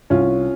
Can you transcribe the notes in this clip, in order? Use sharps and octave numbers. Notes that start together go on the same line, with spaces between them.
C2 C#4 F4